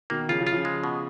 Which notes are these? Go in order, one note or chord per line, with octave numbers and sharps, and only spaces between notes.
B2 D#3 A#3
C#3 F3 F4
C#3 F3
F4
C#3 F3
G#3
B2